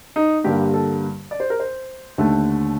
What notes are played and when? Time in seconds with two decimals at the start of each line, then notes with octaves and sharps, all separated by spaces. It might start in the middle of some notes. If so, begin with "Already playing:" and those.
0.16 D#4
0.44 G2 D3 G3 A#3 G4
0.74 A4
1.31 D5
1.40 C5
1.50 A#4
1.60 C5
2.18 D#2 D3 A3